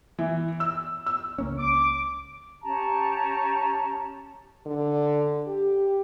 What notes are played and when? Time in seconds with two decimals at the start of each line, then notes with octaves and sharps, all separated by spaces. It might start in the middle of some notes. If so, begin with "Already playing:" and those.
0.19 E3
0.60 E6
1.06 E6
1.38 C#2 A#3 C#4
1.58 D6
2.62 C#4 G4 A5 A#5
4.66 D3
5.47 G4